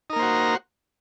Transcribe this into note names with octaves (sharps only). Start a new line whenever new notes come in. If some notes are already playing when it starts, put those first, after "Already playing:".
A#3 D#4 F#4 A#4 C5